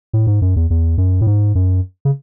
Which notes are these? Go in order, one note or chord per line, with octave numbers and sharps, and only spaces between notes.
A2
G#2
F#2
E2
E2
F#2
A2
G#2
F#2
C#3